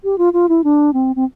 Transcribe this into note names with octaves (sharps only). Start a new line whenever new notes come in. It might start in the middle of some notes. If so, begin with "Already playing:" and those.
G4
F4
F4
E4
D4
C4
C4